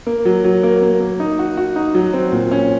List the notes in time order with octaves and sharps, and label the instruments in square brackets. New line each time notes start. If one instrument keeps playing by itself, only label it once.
[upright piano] A#3
F#3
F#3
A#3
A#3
A#3
D#4
F#4
F#4
D#4
F#3
C4
A#2
C#4